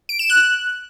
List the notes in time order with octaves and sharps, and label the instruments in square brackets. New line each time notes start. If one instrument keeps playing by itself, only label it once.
[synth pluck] D7
E7
F#6